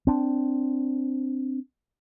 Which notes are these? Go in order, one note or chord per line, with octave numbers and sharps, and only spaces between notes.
C4 D4